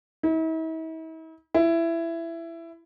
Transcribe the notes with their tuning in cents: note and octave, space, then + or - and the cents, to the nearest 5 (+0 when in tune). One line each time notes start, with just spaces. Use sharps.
E4 -45
E4 +15